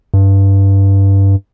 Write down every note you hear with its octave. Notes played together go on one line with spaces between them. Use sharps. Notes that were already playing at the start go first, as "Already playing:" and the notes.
G2